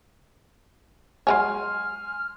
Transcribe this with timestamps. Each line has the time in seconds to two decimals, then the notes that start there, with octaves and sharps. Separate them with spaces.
1.27 F#3 G#3 C#5 G#5 C6 F6